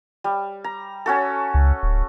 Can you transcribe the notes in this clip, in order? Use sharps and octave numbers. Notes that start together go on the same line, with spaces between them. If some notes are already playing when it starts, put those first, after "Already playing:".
G3
A#5
C#4 F#4 A4
C#2
D1